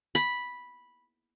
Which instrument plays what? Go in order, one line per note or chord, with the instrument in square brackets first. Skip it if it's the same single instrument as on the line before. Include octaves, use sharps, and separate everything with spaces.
[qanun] B5